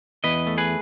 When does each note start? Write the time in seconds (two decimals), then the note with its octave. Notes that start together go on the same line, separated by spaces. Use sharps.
0.24 E2 B4 D#5
0.47 A3
0.58 G#4 B4